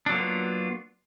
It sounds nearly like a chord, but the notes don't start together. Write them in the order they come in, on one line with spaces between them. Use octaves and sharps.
D4 F#3 A#3 B3 F4